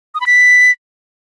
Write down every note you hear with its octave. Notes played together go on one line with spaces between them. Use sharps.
D#6
B5
B6